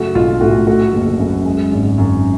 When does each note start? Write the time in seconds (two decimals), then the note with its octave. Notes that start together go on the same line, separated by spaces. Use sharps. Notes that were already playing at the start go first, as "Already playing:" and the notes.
Already playing: F#2 C#3 A3 F#4
0.15 B1 F4
0.41 A2 F#4
0.67 A3 F#4
0.93 F#1
1.19 F#2
1.46 G#3
1.72 G#1
1.98 F#2